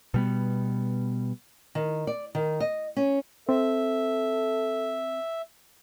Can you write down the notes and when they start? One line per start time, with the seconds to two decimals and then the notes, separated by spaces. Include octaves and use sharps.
0.14 B2 G3 B3
1.75 D#3
2.07 D5
2.35 D#3
2.60 D#5
2.97 C#4
3.49 C4 A4 E5